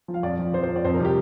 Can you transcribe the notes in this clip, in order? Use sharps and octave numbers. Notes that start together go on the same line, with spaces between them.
F3
F5
F2 D5
F3
F2 C5
C5
F3
D5
F2 C5
A#4
C3 G3
G4